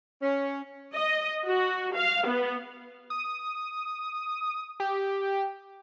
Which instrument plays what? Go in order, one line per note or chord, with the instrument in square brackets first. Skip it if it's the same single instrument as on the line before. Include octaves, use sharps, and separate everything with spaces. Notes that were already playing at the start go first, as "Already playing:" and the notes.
[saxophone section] C#4
[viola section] D#5
F#4
F5
B3
[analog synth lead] D#6
G4